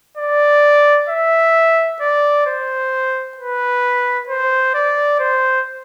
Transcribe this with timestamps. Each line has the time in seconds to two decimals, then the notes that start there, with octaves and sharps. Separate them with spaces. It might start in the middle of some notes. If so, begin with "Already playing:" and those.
0.17 D5
1.09 E5
2.01 D5
2.46 C5
3.37 B4
4.29 C5
4.74 D5
5.20 C5